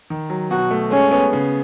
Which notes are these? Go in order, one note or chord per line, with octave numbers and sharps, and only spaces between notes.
D#3
F#3
B2 F#4
A3
G#3 C#4
B3
C#3